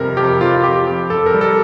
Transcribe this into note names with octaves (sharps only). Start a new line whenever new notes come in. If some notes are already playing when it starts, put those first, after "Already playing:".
Already playing: F2 C3 G3 A#4
F2 G4
F2 F4
F2 G4
F2
F2 A4
A#4
G3
A4